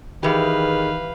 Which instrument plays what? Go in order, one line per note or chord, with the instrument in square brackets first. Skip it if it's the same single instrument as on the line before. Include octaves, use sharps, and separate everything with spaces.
[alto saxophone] D#3 [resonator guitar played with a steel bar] E3 G4 [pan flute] G#4 [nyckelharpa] B4 F5